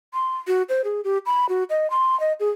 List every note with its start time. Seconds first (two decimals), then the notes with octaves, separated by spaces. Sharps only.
0.14 C6
0.47 F#4
0.69 C5
0.84 G#4
1.04 G4
1.26 B5
1.49 F#4
1.70 D#5
1.90 C6
2.20 D#5
2.40 G#4